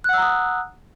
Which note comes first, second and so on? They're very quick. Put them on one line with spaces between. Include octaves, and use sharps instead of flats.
F#6 F#5 E6 A#5 D#6